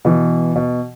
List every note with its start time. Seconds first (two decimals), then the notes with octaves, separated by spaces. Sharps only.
0.05 B2 E3
0.56 B2